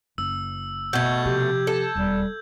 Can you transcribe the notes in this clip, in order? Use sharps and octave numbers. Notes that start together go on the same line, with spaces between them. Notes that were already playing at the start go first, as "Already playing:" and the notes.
F#1 E6
B2 A3 G6 G#6
C3 F3 G4
A4
E1 D#2 G3